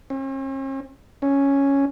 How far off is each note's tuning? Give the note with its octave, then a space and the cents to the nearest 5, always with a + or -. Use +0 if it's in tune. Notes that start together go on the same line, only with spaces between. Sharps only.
C#4 -45
C#4 +0